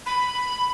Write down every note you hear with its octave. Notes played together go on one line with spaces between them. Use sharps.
B5